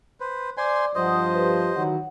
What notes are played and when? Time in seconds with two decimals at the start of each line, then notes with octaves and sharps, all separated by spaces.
0.20 B4 C5
0.57 C5 D5 G#5 C6 D6
0.95 G2 F3 C5 D#5 F#5 D#6
1.34 G4 B4
1.76 D#3 E3 F#3 F#5